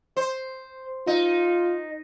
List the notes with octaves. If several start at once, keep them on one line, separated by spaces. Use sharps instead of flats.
C5
D#4 F4